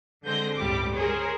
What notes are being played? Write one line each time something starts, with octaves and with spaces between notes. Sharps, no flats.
D3 G#3 C4 C5 G6 A#6
G1 C#2 A2 G3 G4 D6
G#4 A#4 C5 C#5